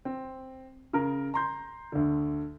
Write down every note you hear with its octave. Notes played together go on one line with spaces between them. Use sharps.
C4
C#3 A#4
A#5 C6 G6
D2 D3